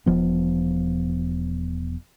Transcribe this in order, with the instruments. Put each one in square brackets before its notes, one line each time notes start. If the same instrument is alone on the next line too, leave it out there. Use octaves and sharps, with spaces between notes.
[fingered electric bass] E1 F3 B3